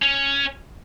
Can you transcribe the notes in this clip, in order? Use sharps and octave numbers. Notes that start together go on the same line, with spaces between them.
C#4